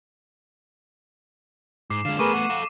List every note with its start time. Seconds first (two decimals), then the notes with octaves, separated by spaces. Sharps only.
1.90 G#2 D6 C7
2.05 D3 G#3 F5 E7
2.19 A3 B3 G#4 A#4 B4 C#6 D6 D#7
2.34 F#5
2.50 A4 F5